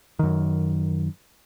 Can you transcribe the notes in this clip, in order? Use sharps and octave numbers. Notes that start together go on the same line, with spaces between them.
F#2 D#3